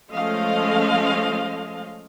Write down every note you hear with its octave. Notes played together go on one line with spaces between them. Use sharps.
F3 G#3 A3 C#4 D#5 F5